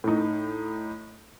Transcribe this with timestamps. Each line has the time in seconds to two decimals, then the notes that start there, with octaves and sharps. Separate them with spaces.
0.04 A2 D#4